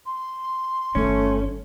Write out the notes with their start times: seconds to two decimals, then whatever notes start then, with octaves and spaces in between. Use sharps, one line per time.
0.06 C6
0.95 G1 D#3 A3 C#4